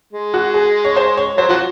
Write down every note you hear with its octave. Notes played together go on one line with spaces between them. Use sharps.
G#3
F#4
G#4
C#5
C5
C#5
F#3 C5
F3 F#4